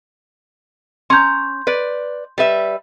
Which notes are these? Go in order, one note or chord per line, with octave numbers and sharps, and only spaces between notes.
C#4 A#5 C6 G6
B4 D5
G3 B4 E5